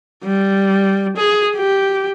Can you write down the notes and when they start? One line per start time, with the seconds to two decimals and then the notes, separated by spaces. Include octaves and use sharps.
0.24 G3
1.17 G#4
1.56 G4